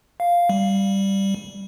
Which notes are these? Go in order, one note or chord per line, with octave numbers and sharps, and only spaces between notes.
F5
G3